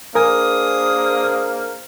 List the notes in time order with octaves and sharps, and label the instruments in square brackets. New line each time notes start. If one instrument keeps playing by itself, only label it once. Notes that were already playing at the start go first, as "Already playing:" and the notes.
[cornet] A#3 [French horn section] D4 G#4 C5 [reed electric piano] A#4 G#5 [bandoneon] D#6